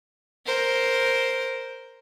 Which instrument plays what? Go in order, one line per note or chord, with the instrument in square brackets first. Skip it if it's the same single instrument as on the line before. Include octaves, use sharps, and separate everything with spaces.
[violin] A#4 C5